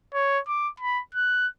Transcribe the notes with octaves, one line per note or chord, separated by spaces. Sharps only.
C#5
D6
B5
F#6